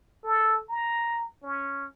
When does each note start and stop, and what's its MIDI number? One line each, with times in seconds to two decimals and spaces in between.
0.24 0.61 69
0.69 1.27 82
1.43 1.86 61